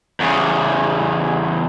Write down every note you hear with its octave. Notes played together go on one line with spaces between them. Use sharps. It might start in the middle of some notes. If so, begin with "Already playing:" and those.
E2 C#3